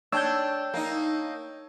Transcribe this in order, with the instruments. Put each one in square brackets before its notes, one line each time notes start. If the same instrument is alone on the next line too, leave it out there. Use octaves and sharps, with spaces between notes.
[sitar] D4 [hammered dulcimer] C#5 G5 A5 [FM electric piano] E6 G6
[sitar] A#3 D#4